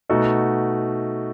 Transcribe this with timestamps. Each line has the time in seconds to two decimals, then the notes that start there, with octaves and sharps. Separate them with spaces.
0.09 B2 A3 D#4 F#4